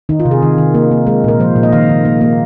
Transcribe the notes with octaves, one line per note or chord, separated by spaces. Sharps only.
D#3 D#4
F4
C3
G#4
D#3
D#3
A#3
A#3
G#3 A#4
A#2 A#4
F3 C5
A#2
D#5
D#3 F5
D#3
A#3
A#3